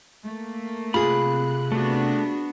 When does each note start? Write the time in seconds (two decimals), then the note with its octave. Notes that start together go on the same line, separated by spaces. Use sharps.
0.24 A3 A#3
0.94 C3 F4 G#4 B5 F#6
1.72 A3 B3 D4 F#4